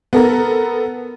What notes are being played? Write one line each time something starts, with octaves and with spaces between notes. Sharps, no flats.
B3 A4 A#4